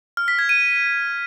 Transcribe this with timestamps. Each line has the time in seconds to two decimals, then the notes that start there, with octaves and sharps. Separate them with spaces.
0.17 F6
0.28 B6
0.39 G#6
0.49 D#7